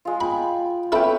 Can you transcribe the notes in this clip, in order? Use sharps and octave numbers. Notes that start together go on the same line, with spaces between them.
G#3 F4
G5 B5
E4 A4 B4 C#5 E5 G5